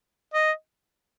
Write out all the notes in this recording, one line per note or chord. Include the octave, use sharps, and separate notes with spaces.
D#5